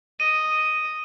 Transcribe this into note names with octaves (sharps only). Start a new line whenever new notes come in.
D#5 D#7